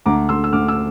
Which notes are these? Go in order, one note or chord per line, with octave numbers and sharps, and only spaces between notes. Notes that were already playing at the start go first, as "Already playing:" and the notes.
D2 A#5 D6
D2 C6 E6
E6
D2 D6 F6
E6